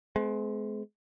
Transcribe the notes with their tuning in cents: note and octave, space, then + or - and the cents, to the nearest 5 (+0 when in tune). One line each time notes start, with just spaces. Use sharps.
G#3 +35 C4 -40